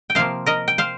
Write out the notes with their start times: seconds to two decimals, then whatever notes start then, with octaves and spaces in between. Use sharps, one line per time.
0.10 G5
0.15 C3 F3 A#3 C5 F5
0.46 A#4 D#5
0.68 G5
0.78 C5 F5